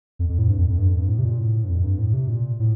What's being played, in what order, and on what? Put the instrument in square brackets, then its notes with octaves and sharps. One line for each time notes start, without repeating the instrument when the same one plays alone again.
[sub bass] F2
F2
A2
G2
F2
F2
G2
F2
G2
A2
C3
A#2
A2
G2
F2
G2
A2
C3
A#2
A2